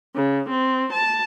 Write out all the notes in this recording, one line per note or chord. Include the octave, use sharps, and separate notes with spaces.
C#3
C4
A5